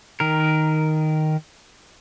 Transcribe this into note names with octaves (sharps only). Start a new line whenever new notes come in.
D#3 A#4